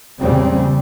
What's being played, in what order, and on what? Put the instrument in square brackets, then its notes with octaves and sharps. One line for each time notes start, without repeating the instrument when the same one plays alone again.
[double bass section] E2 A#2 C#3 G3 C4